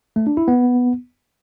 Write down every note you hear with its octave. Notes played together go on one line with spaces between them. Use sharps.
A3
D4
E4
B3